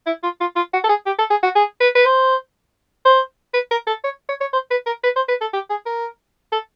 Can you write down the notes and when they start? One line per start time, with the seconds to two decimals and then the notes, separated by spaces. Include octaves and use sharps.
0.07 E4
0.23 F4
0.41 F4
0.56 F4
0.73 F#4
0.84 A4
0.89 G#4
1.06 G4
1.19 A4
1.30 G#4
1.43 F#4
1.56 G#4
1.80 B4
1.95 B4
2.06 C5
3.05 C5
3.54 B4
3.71 A#4
3.87 A4
4.04 C#5
4.29 C#5
4.41 C#5
4.53 C5
4.71 B4
4.86 A#4
5.04 B4
5.16 C5
5.29 B4
5.41 A4
5.54 G4
5.70 G#4
5.86 A#4
6.52 A4